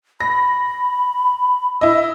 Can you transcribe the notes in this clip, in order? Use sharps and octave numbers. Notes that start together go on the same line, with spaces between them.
B5 A#6
E4 D#5 E6